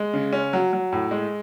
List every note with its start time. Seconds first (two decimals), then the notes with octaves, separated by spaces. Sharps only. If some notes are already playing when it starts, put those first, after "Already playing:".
Already playing: G#3
0.13 C#3
0.33 C#4
0.53 F#3
0.73 F#3
0.92 A2
1.11 G#3